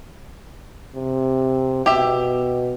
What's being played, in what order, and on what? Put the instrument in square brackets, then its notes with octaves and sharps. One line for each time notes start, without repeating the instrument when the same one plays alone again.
[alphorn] C3
[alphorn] B2 [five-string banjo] G4 E5